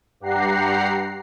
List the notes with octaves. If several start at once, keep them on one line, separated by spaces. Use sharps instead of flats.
G2 G4 F#5 A#5 C7